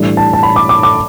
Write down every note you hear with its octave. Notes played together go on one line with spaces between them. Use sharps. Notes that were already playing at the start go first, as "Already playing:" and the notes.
Already playing: A2 E3 G3 D4
A5
A5
B5
D6
D6
D6